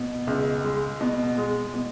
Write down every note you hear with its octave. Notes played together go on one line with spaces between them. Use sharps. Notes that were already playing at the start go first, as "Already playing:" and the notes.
Already playing: B2
C#2
G#3
B2
G#3
B2